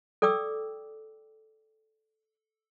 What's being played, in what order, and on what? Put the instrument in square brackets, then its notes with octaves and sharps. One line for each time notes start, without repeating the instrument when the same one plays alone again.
[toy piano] A4 D5 G5 D6 E6